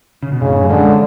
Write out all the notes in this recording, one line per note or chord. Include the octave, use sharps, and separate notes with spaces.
C#3
B2
F#2 A2 C#3
F#3
D3 F3 G#3